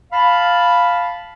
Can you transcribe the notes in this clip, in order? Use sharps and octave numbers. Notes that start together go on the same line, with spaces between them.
F5 A5 B5